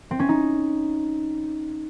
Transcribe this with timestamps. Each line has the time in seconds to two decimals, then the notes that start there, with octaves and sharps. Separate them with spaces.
0.11 C4
0.19 C#4
0.29 D#4